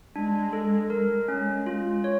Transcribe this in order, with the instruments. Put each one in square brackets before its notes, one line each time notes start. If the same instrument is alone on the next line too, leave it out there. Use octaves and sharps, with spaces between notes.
[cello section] G#3 [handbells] D4
[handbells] A4
[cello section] G#3 [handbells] A#4
[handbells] C#4
F4
C#5